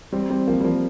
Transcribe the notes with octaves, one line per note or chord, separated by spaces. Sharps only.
G3 C4
G3 C4
F3 A#3
G3
F3 A#3